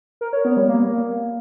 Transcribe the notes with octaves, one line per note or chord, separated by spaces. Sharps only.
A#4
C#5
B3
G3
A#3